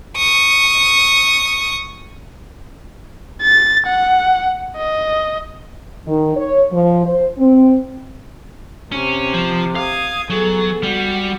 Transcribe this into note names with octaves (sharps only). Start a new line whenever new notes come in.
C#6 D#6
A6
F#5
D#5
D#3
C#5
F3
C5
C4
C3 C#4
F3
F5 D#6 G#6
F#3 B3 G#4 A4
G3 F#4